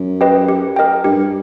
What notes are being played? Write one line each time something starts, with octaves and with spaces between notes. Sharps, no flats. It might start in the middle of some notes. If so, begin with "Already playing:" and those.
Already playing: F#2
G4 B4 D#5 G5
G4
A#4 D#5 G5
G2 G4